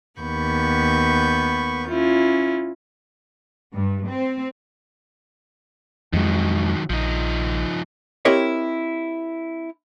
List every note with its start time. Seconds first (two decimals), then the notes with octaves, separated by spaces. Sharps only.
0.19 D#2 B3 B5 C#6 G6
1.88 C#4 E4 F4
3.74 G2
4.07 C4
6.13 F2 D#3 F#3 G#3
6.90 A#1 F3 D#4
8.25 C4 E4 G4 A#4 C#5 D#5